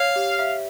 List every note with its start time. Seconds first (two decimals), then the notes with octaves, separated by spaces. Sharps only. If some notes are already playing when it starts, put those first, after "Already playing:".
Already playing: C#5 F5
0.16 G4
0.39 E5